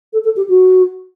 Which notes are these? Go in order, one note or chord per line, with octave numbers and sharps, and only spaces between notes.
A4
A4
G4
F#4